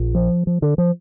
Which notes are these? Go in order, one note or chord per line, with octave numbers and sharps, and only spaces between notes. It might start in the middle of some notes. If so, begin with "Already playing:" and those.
Already playing: A#1 A#2
F3
F3
D3
F3